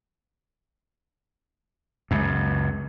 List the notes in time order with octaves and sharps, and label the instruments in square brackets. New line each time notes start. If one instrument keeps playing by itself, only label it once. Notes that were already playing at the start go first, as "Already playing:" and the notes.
[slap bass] C#2 F#2